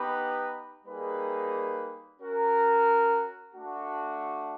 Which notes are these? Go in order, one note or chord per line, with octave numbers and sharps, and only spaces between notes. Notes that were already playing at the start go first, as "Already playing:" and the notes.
Already playing: B3 D#4 G4 B4
G3 A#3 D#4 G#4 B4
C#4 F#4 A#4
A3 D4 F#4